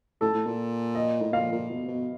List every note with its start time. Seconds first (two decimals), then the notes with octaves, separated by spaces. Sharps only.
0.21 A2 A4
0.34 A2
0.46 A#2
0.95 D#5
1.22 A2
1.33 A#2 F5
1.52 A#2
1.70 B2
1.88 B2